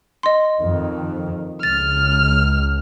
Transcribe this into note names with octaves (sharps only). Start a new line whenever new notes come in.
D#5 C6
F2 D#3
C#2 F6 A6